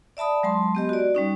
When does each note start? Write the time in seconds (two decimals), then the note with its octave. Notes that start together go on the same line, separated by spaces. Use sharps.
0.17 D5 E5 A5 B5 D#6
0.43 F#3 G#3 A5 C6
0.75 B3 G4 D#5
0.89 F#4 D5
1.15 G3 C#4 D#4